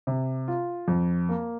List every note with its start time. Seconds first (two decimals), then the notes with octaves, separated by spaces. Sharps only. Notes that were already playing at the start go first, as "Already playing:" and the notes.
0.07 C3
0.48 F4
0.88 F2
1.29 A#3